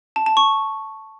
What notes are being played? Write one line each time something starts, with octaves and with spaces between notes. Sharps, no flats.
A5
A5
C#6